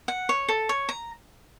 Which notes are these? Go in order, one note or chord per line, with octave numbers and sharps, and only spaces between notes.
F#5
C#5
A4
C#5
A#5